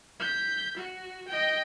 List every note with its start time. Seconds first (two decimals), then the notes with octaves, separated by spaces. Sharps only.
0.20 G6 B6
0.77 F#4
1.28 D#5 G5